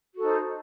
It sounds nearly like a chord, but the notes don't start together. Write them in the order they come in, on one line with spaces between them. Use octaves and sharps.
F#4 A4 D#4 C5